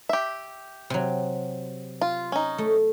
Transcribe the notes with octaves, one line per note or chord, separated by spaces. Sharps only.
G4 E5
C3 F#3
F4
C#4 D#4
A3